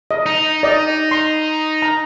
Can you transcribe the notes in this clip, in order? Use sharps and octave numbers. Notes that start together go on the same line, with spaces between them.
D#5
D#4
D5 D#5
C6
A#5